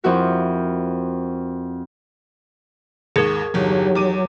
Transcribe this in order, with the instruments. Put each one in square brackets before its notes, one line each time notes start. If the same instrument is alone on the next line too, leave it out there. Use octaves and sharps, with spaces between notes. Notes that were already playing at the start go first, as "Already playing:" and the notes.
[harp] F2 F3 E4 F#4 A#4
[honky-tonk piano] D#2 G#2 G#6 [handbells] G#4 A#4
[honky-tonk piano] G1 E2 [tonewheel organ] F#3 [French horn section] D#4 G4
[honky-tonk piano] E2 D6 D#7